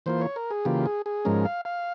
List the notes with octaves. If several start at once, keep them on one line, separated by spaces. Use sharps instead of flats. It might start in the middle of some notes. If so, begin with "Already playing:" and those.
E3 A#3 F4 C5
C#5
A#4
G#4
C#3 E3 A#3 F4 G4
G#4
G#4
G#2 F3 G#3 C#4 A#4
F5
F5